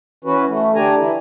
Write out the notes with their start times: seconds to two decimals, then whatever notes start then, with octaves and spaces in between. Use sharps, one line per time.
0.25 E3 C#4 F#4 B4
0.47 A3
0.75 D3 D4 G4 G#5 A#5
0.98 E3 E4